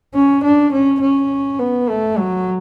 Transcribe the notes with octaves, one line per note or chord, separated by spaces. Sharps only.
C#4
D4
C#4
C#4
B3
A3
F#3